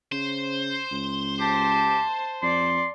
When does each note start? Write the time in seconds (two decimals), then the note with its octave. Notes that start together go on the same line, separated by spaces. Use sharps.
0.12 C#3 C5
0.92 C#2
1.40 G4 A5
2.42 F2 D5 C6